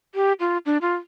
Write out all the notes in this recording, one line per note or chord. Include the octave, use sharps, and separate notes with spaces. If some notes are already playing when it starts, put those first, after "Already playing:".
G4
F4
D4
F4